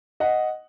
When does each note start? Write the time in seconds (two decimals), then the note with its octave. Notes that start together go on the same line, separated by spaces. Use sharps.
0.20 D#5 F#5